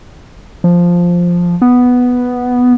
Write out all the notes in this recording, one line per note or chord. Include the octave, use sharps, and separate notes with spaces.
F3
B3